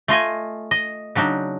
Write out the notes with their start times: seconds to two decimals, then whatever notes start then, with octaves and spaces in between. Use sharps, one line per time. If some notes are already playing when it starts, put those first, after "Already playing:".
0.08 A3 F4 D#5 G#5
0.71 D#5
1.15 C#3 F#3 D4 D#4